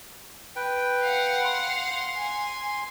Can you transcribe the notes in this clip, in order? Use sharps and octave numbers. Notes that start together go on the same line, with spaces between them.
B4 G5
F5 F#5
C6
G#5